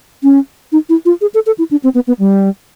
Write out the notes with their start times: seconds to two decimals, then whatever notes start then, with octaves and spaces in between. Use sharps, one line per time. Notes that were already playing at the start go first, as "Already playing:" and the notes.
0.23 C#4
0.72 D#4
0.89 E4
1.06 F4
1.21 G#4
1.34 A4
1.46 A4
1.58 E4
1.71 D4
1.84 C4
1.95 B3
2.07 B3
2.19 G3